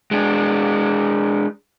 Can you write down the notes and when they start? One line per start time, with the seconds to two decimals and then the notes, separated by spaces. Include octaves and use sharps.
0.11 G#3 D4